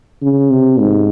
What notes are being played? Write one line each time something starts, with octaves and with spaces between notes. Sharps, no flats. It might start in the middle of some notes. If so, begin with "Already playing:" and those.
C#3
C3
G#2